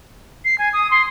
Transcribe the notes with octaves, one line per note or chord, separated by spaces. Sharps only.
C7
G#5
D#6
C6